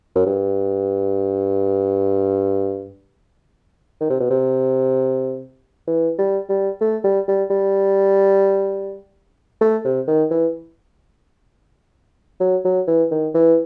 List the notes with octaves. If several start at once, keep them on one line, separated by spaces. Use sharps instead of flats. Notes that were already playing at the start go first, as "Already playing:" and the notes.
F#2
G2
D#3
C3
B2
C3
E3
G3
G3
A3
G3
G3
G3
A3
C3
D#3
E3
F#3
F#3
E3
D#3
E3